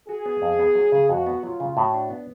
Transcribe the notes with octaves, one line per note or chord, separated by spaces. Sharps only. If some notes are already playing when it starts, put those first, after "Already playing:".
F#4 G#4
B3
F2
B3
F#3
C#3
F2 F#4
B3
F#3 F4
C#3
A2 F#4
D4
B3